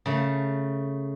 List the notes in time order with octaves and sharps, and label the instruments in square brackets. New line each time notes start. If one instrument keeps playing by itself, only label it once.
[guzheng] C#3 A3